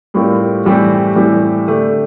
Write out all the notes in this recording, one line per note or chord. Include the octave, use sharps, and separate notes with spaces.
A2 G3 C4 F4 A#4
A2 E3 G3 C4 G4
A2 E3 G3 C4 G4
D3 A3 D4 G4